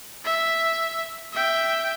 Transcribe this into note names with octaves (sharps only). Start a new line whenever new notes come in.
E5
E5 G5